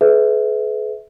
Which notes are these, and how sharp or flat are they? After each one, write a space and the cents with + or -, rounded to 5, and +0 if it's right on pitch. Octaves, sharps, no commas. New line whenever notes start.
G#4 +45 B4 +20 E5 -25